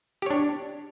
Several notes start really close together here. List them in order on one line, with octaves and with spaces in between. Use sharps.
G4 C#5 D4